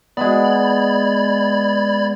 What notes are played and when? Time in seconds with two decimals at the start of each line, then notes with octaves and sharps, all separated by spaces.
0.17 G#3 B3 D5 B5 G#6